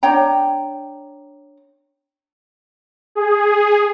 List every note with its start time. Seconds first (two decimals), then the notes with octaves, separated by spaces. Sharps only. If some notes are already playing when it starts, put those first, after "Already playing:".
0.03 D4 C#5 G5 A#5
3.15 G#4